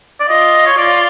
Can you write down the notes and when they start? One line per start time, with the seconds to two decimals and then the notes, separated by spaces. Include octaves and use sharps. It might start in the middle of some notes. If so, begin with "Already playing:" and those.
0.20 D5
0.28 F4 D#5
0.67 C#5
0.78 F4 D5